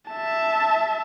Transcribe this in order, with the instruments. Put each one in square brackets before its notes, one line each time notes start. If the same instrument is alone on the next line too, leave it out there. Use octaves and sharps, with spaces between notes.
[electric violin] E5 A5